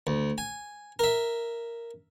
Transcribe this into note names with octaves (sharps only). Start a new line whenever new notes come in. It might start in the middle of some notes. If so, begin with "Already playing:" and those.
D2
G#5
A#4 E5